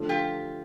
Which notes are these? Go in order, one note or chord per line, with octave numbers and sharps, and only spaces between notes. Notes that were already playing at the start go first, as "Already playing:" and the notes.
Already playing: D3 F3 A3 D4
F4 G4